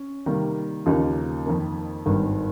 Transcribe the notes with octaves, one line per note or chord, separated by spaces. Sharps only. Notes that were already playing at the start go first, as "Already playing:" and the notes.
Already playing: C#4
C3 D#3 G3 A#3
D#2 C#3 F3 A#3 D#4
F2 D#3 A#3
G#1 G2 D#3